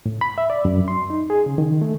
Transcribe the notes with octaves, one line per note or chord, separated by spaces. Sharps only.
A2
B5
E5
D5
F#2
C6
D#4
G#4
C#3
D#3
A3